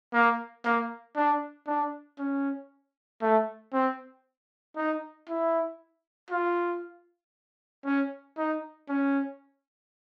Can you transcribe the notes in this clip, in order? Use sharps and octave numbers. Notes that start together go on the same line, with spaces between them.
A#3
A#3
D4
D4
C#4
A3
C4
D#4
E4
F4
C#4
D#4
C#4